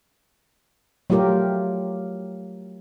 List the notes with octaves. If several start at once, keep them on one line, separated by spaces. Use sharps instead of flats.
F#3 A3 F4 G4 A#4